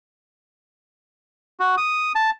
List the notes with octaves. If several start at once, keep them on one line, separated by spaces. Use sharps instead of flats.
F#4
D#6
A5